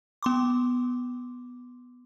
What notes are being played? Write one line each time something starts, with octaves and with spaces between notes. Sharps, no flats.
B3 C6 D6